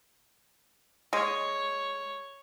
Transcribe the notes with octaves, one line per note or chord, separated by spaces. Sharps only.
G#3 C#5